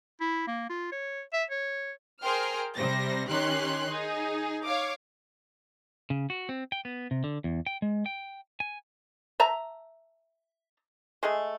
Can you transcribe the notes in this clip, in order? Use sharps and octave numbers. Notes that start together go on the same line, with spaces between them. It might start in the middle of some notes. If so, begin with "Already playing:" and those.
E4
A#3
F4
C#5
E5
C#5
G#4 A#4 C5 G5 C6 F6
C3 G3 C5 A#6
D#3 C#4 G4 C#5 C6 F#6
D#4 G#4
C#5 F5 D6
C#3
F#4
C4
G5
B3
C3
D3
E2
G5
G#3
G5
G#5
E5 A5 A#5
G#3 A3 G#4